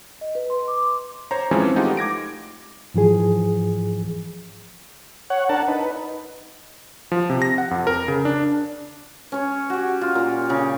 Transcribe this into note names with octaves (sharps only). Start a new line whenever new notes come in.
D#5
B4
C6
D6
C5 C#5 A#5
E3 F3 G#3 C4 C#4
G#3 A3 D#4 F4 G4 F#5
D6 G#6 A#6 D7
G#2 E3 F3 G#4
C#5 F#5
D4 A#4 F#5 A5
D#4 B4
F3
C3
A#6
F#5
F2
A#4
C#3
D4
C#4 C#5
F#4 G4
F4
A#2
C#3 G4